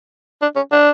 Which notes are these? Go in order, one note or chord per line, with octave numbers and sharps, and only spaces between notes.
D4
C#4
D4